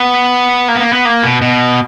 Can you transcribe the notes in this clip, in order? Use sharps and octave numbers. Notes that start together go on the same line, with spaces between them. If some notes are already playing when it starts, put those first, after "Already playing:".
Already playing: B3
A#3
B3
A#3
B3
A#3
B2
B2